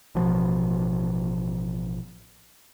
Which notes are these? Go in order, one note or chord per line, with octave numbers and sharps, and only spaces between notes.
A1 B2 F3